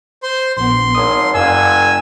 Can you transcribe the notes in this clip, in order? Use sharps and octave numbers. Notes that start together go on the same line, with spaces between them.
C5 C6
A#1 B3 C6
G#1 C#5 D#6
F#1 F#2 D5 F5 G#5 E6